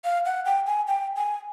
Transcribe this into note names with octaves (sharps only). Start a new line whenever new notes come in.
F5
F#5
G5
G#5
G5
G#5